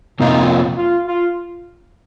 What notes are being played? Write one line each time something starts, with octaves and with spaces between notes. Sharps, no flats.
F2 C3 F3 A#3 D#4 F4
F4
F4